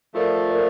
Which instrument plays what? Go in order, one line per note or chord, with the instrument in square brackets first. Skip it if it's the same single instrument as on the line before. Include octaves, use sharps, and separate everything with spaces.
[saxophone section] F3 A3 [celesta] F4 A#4 D5
[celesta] A#4 D5